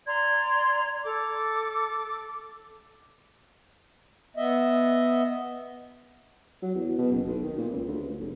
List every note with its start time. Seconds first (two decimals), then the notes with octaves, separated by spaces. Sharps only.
0.06 D5 A#5 C6 G#6
1.03 A4 D6
4.37 B3 D#5 E5
6.62 F#3
6.75 E2
6.98 B2
7.12 F#1
7.27 B1
7.42 D#3
7.58 A#2
7.71 C#2
7.87 D2
8.02 C#2
8.19 F1